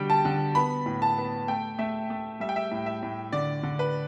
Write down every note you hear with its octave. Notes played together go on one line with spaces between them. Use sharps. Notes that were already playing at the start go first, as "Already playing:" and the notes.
Already playing: B2 D3 G3 G5
A5
D3
B3 B5
A2
A5
B3
A3 G5
A3 E5
A3
G3 E5
G5
E5
A2
E5
A2
D3 D5
D3
B4